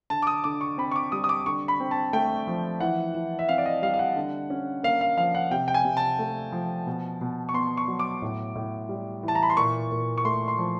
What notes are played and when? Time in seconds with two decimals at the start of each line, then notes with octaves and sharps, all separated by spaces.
0.10 D3 A5
0.22 D6
0.27 D#6
0.44 D3 D6
0.61 C#6
0.78 C4 B5
0.91 C#6
0.96 D6
1.12 G3 D#6
1.24 D#6
1.29 D6
1.46 D3 C#6
1.68 B5
1.80 C4
1.91 A5
2.13 A3 G5
2.47 F3
2.80 E3 F#5
3.15 E3
3.39 E5
3.49 C4 F5
3.58 D5
3.66 D#5
3.82 G3 F5
3.94 F5
3.99 F#5
4.16 D3
4.50 C#4
4.83 A#3 F5
5.01 F5
5.17 F3 F5
5.35 F#5
5.51 C3 G5
5.68 G5
5.74 G#5
5.85 C3
5.97 A5
6.19 A3
6.52 F3
6.87 B2
7.21 B2
7.49 C#6
7.54 B3 C6
7.77 C#6
7.88 F#3
7.99 D6
8.22 A2
8.55 A2
8.89 G3
9.23 E3
9.28 A5
9.35 A#5
9.43 B5
9.50 C6
9.57 A#2 C#6
9.92 A#2
10.18 C#6
10.25 A3 C6
10.48 C6
10.58 F3